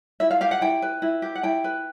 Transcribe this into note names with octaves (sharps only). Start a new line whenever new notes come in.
E4 E5
F5
G4 F5
F#5
E4 G5
B4
E4
G4
F#5
E4 G5
B4